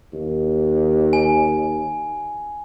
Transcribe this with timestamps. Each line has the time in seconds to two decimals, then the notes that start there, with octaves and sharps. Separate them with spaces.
0.13 D#2
1.13 G#5